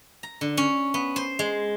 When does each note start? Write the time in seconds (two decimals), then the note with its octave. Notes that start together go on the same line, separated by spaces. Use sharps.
0.23 A#5
0.41 D3
0.57 C#4
0.94 B3
1.16 C5
1.39 G#3